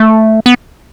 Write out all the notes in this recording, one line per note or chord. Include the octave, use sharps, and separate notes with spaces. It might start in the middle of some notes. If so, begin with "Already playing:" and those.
Already playing: A3
B3